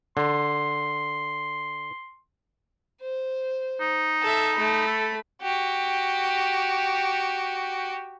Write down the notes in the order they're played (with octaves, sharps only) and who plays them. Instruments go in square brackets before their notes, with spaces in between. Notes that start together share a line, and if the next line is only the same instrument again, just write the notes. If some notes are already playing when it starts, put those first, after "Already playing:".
[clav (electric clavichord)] D3 [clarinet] C6
[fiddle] C5
[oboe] D#4
[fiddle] A4 E5
A3 B5
[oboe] A4
[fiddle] F#4 G4